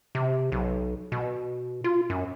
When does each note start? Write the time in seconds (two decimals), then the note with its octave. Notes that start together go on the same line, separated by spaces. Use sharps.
0.15 C3
0.52 B1
1.12 B2
1.84 F4
2.10 F#2